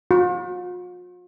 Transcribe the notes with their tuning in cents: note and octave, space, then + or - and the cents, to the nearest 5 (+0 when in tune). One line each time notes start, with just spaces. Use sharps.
F4 +45